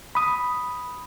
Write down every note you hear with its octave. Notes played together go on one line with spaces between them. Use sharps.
B5 D#6